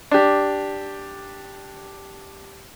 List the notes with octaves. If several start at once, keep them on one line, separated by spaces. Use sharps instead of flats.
D4 G4